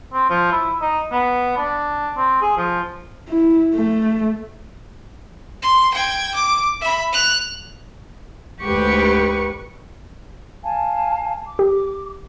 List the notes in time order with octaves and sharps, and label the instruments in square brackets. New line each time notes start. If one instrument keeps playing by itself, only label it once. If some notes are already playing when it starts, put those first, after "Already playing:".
[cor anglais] C4
F3
E4
D#4
B3
D4
C4
G#4
F3
[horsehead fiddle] E4
A3
[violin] C6
G5 G#6
D6
E5 B5
F#6 F7
[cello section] D2 G#2 G4 [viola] B4 C#6
[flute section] F5 G#5 A5
D6
[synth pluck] G4